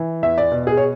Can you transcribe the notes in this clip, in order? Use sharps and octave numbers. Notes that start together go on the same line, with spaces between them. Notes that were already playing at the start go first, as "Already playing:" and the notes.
Already playing: E3
E2 E5
D5
B2
G#4
C#5